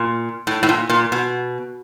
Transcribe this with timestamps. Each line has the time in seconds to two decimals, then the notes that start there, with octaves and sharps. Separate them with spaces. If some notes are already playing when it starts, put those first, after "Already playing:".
Already playing: A#2
0.47 A2
0.63 A2
0.69 A#2
0.90 A#2
1.12 B2